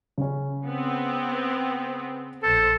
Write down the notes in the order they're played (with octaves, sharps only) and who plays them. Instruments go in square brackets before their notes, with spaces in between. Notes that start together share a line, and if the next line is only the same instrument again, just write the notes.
[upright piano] C#3 C#4
[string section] B3 C4
[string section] A#1 C5 [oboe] A4